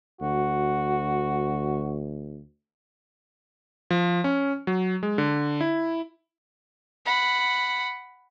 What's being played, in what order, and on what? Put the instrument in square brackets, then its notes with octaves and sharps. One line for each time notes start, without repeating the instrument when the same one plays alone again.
[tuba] D2 [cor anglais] F#4
[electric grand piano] F3
C#4
F#3
G#3
D3
E4
[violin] F#5 B5